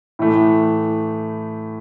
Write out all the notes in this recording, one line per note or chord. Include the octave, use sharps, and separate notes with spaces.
A2 E3 A3